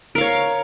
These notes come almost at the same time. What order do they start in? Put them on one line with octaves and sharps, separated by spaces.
A#4 F5 C#5